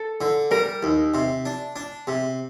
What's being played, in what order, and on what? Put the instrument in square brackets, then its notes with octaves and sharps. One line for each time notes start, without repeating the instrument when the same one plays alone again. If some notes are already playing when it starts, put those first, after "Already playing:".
Already playing: [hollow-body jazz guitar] A4
[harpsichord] D3
[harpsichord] G3 [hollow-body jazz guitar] A#4
[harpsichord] D#2
C3
D4
D4
C3